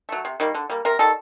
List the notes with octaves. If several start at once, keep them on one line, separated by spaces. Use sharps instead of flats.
F#3 A3
C3
D#3 G3 A#3
D3
G3 A#3
C3 A#4
D#3 G3 A4